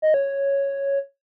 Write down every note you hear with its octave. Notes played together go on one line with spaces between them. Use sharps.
D#5
C#5